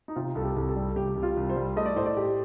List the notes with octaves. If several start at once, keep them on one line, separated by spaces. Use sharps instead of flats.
D#4
C3 F4
C2 A4
G4
C2
A4
G3
C3 G4
C2
F4
C2
C5
G3
A3 D#5
D5
A2 C5
D5
G4